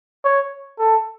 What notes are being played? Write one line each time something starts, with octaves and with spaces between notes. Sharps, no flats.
C#5
A4